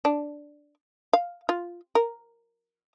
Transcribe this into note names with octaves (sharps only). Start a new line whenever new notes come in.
D4
F5
F4
A#4